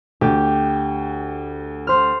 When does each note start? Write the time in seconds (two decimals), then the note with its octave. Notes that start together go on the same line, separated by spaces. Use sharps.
0.21 D2 G4
1.87 C5 F6